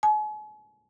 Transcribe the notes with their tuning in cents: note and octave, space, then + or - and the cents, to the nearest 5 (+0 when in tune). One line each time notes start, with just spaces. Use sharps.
G#5 +40